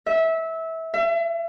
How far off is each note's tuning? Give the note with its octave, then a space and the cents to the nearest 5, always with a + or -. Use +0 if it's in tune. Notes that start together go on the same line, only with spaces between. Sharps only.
E5 -20
E5 +35